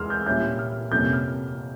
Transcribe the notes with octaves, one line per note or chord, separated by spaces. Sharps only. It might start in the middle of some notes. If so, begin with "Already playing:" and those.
Already playing: E2 E3 G#3 C6 E6 F6
G6
A#2 G3 C#4 E4 G6
F6
F2 C3 G3 A#3 C#4 G6
F6